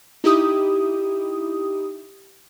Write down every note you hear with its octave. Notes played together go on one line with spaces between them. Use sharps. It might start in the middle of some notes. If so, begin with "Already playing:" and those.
D#4 E4 G4 D#6